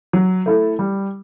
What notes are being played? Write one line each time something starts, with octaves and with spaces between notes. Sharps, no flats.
F#3
A3 E4 A4
G3